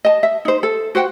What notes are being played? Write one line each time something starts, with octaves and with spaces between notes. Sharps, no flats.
D#5 A5
E5
D#4 C5
A4
F#4 C5 F#5 G5